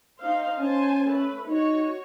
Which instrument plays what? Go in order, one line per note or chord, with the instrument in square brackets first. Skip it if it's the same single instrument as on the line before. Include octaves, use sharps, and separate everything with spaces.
[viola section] D#4 C5 F5
[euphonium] C#4 [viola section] C5 G#5 A5
[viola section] A3 B4
[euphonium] D#4 [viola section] F#4 C#5